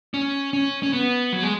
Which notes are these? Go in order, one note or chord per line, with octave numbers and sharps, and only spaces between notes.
C#4
C#4
C#4
B3
F#3
G#3